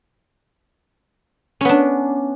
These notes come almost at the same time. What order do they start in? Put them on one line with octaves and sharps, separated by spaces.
C#4 B3 D4